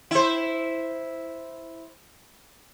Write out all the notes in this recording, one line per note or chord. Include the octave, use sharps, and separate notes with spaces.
E4 C5